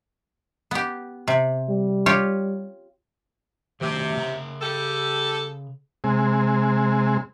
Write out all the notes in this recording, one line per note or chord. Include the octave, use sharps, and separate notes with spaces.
B3 G4
C3
G3
F4 G4 C#5
C3 D#3 F#3 A3
C#3 F#5 A#5
G3 G4 A4
C3 G#3